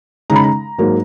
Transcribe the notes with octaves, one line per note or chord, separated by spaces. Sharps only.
C#3 G#3 D#4 A#5
B5
A#5
G#2 F#3 A#3